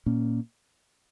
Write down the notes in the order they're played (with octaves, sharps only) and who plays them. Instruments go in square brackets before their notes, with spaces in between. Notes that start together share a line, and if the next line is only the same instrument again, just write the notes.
[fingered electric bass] A#2 A#3 C#4